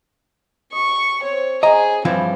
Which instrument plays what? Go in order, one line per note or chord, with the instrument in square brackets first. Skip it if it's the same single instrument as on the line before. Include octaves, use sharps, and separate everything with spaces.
[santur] G4 D#5 [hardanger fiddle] C#6
[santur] C4 [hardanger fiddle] C#5
[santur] C#4 C5 [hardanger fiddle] G#4 [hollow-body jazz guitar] D#5 A#5
[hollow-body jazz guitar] G2 E3 F3 [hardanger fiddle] C4